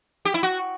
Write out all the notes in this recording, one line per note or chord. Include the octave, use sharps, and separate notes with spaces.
G4
E4
F#4